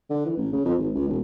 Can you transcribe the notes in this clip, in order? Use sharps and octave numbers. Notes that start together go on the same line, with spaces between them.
D3
E3
A1
C#3
F2
G#1
C#2
E1